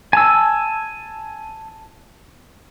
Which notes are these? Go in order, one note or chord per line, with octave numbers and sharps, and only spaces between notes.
G#5 A5 E6